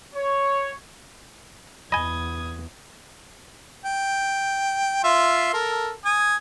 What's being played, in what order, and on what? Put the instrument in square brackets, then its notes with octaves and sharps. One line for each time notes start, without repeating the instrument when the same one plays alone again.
[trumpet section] C#5
[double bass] E2 [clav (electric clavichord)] D#5 G#5 [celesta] B5 G7 [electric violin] D#6 G#6
[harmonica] G5
F4 E5 C6
A4 A#4
G#5 D#6